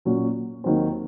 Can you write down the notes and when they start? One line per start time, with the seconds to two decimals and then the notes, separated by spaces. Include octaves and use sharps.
0.05 A#2 F#3 C#4 F#4
0.64 D#2 D#3 F#3 C4